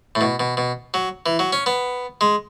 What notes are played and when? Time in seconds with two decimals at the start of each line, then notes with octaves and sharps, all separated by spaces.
0.15 A2
0.21 B2
0.40 B2
0.57 B2
0.94 F#3
1.26 E3
1.39 F#3
1.53 C#4
1.66 B3
2.21 G#3